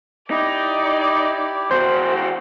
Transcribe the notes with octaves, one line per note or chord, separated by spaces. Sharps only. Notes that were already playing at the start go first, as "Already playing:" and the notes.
D#4 E4 G4 D5
E2 F#4 C5 G5 C6